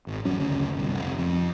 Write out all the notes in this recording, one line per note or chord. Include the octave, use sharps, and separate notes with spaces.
G#1
G#1 F#2 F#3 C#4
F#1 D2 C#3
G1 C2
F1
F2